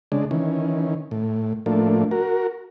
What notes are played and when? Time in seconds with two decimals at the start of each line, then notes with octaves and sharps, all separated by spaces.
0.12 C#3 G#3 D4
0.31 D#3 E3 C#4
1.11 A2
1.66 A2 F3 A3 A#3 D4
2.11 F#4 A#4